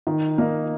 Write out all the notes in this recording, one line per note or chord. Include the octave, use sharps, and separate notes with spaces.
D#3
A#3 D#4